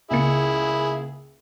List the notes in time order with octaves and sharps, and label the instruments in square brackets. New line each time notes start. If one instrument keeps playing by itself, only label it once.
[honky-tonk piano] C#2 A#3 C#7 [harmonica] E4 G#4